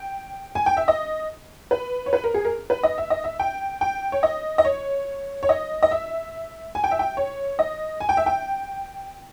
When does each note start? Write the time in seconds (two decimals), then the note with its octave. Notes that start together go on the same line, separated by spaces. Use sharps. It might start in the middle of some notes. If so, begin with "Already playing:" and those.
Already playing: G5
0.55 G#5
0.66 G5
0.77 E5
0.88 D#5
1.71 B4
2.06 C#5
2.13 B4
2.24 A#4
2.34 G#4
2.45 A#4
2.70 B4
2.83 D#5
2.98 E5
3.10 D#5
3.24 E5
3.39 G5
3.81 G5
4.12 C#5
4.23 D#5
4.58 D#5
4.65 C#5
5.43 C#5
5.49 D#5
5.83 D#5
5.91 E5
6.75 G#5
6.84 G5
6.91 E5
6.99 G5
7.17 C#5
7.59 D#5
8.00 G#5
8.09 G5
8.17 E5
8.26 G5